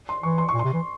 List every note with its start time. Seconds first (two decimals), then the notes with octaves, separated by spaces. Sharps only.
0.09 C6
0.23 E3 C#6
0.38 C6
0.49 C#6
0.54 A#2
0.59 C3 C6
0.73 E3